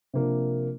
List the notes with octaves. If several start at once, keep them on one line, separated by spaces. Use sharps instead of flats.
C3 F3 A#3 D4